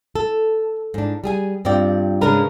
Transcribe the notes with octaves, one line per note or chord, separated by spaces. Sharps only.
A4
G#2 D4
G3 G#4 G#5
G2 C4 F4 D5 G5
G#2 C#3 G#3 D4 A#4 B4